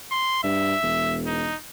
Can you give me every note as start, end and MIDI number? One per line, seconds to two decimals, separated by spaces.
0.11 0.42 84
0.44 0.74 43
0.44 1.18 76
0.83 1.51 28
1.27 1.56 63